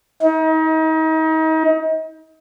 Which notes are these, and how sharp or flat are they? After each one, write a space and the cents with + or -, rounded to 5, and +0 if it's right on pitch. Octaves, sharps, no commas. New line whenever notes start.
D#4 +35